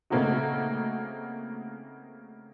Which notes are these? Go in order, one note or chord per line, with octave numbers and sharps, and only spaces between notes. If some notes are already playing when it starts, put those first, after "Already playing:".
C#3 A3 A#3 C4 D#4 F#4